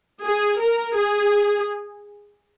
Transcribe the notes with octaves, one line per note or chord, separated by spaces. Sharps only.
G#4
A#4
G#4